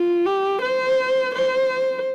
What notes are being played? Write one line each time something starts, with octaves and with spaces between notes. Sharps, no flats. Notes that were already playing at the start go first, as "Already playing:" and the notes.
Already playing: F4
G4
C5
C5